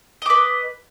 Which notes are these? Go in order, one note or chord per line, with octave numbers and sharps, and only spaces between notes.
B4 D#5 D6